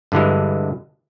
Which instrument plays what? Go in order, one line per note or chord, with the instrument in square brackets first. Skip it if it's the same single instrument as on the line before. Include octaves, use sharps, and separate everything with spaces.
[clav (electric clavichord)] G2 D3 E3 G#3